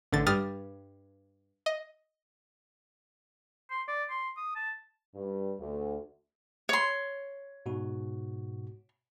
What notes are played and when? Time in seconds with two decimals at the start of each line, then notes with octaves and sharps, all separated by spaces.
0.12 A1 D3 A6
0.26 G2 G3 D#6 F6 A6
1.66 D#5
3.70 C6
3.88 D5
4.10 C6
4.37 D#6
4.55 A5
5.15 G2
5.59 D2
6.69 C#5 C6
7.66 G#2 B2 F#4